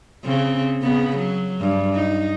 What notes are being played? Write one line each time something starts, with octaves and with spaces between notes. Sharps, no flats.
C#3 C4
C#3 B3
F#3
G2
D#4